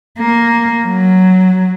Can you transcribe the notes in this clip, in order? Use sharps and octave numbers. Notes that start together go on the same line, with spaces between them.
A#3
F#3